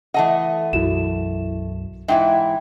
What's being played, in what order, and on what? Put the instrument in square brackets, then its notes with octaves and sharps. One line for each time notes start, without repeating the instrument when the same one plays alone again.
[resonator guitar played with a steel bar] E3 A3 D#5 [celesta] F#5 A5
[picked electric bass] B1 F#2 [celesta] E4 F#4 E7
[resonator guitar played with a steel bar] G#2 E3 E4 [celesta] E5 G5